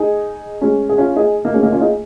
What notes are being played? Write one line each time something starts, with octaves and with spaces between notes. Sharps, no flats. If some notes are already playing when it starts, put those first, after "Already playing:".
Already playing: D#4 G#4
G#3 C#4
G#4
C#4 F4
D#4 G#4
A#3 D#4
G#3 C#4
A#3 D#4
C#4 F4
D#4 G#4